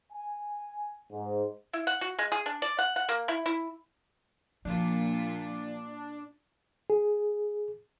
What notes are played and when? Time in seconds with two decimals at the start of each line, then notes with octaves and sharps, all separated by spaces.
0.13 G#5
1.12 G#2
1.73 E4
1.87 F#5
2.01 F#4
2.19 G#3
2.32 G#4
2.46 D4
2.62 D5
2.79 F#5
2.96 F#5
3.09 A#3
3.28 E4
3.46 E4
4.65 A#2 F3 A#3 D4 F4
6.90 G#4